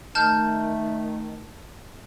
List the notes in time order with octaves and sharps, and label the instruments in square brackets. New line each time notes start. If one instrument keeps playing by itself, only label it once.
[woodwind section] D#3 A3 [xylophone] A5 F6 G6